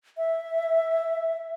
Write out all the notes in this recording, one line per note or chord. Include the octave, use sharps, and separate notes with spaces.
E5